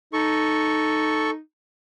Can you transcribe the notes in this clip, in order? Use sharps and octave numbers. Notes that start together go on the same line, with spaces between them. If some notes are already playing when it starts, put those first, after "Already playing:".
D#4 A4 C#6